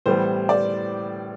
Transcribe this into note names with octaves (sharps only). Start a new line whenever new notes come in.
A2 E3 G3 B3 C5
D5